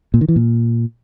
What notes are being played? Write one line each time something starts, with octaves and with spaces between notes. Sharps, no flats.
A#2
D#3
E3
A#2